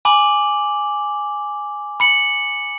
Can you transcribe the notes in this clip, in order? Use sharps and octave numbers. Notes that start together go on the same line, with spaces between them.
G#5 B5 D6 F#7
B5 C#7 F#7